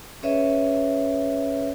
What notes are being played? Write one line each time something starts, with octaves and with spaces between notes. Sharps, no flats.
C#4 G#4 B4 C#5 D#5 E5